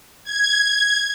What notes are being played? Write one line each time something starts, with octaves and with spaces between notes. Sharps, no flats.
G#6